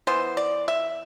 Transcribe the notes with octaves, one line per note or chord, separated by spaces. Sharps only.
E3 B3 C5
D5
E5